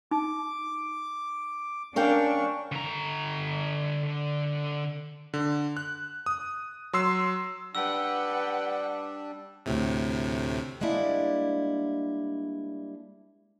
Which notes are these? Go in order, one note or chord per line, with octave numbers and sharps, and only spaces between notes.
D#4 D6
C#4 D4 A#4 F5 G5 C#6
D3 A#5
D3
F#6
D#6
F#3 C6 E6 C7
G3 D4 B4 F#5 G5 E6
D2 A2 C3
G3 G#3 A#3 D4 E4